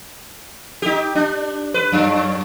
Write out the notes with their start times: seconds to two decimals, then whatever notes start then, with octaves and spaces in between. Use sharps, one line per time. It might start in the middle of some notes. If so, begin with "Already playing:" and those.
0.82 D#4 G4
1.15 D4
1.74 B4
1.92 F#2